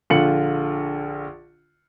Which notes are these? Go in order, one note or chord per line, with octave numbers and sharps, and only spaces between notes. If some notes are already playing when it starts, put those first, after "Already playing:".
A#1 D3 F4 C#7 F#7